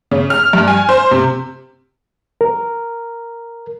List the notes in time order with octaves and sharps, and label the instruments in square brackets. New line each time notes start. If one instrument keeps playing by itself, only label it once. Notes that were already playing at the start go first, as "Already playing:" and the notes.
[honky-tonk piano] C#3
F6
G2
G#5
C5
C3
[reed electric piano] A#4